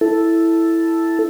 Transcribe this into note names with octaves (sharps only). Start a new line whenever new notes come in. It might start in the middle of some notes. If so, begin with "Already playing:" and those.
E4 A4